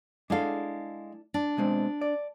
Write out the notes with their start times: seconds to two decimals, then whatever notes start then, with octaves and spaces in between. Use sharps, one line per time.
0.30 G#3 D4 E4 A4 F5
1.34 D4
1.57 B2 G#3 C4
2.01 D5